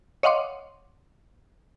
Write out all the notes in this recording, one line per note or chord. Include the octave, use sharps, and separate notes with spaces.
C#5 D#5 F5 F#5 C6 D6